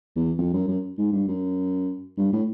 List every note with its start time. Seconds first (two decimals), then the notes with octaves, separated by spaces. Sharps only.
0.16 E2
0.38 F2
0.54 F#2
0.68 F#2
0.98 G#2
1.12 G2
1.28 F#2
2.17 G2
2.33 A2